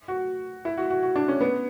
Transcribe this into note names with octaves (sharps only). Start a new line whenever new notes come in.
F#4
E4
F#4
F#4
F#4
D4
C#4
B3